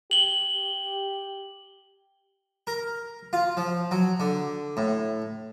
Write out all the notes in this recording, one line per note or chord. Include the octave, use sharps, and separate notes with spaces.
G4 F#7 G7
A#4
F4
F3
F#3
D3
A2